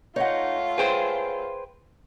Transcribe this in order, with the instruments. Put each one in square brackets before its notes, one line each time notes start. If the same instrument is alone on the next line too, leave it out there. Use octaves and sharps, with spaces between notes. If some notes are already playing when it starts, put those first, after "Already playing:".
[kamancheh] A3 F4 [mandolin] D#4 [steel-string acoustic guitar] C#5 F#5
[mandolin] G#4 C5 [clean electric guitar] B4 G5